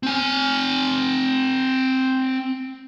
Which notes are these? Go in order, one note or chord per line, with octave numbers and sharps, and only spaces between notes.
C4 G#5